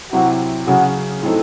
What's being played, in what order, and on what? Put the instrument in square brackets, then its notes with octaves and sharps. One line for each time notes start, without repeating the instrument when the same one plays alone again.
[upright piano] C3 F#3 C4 E4 [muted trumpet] F#4
[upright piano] C#3 F#3 C#4 G#4 [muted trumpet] F#4
[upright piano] A2 F#3 C4 D#4 A4